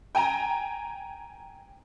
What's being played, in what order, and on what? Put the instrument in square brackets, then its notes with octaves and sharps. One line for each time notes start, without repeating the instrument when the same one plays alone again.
[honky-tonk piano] G5 G#5 A#5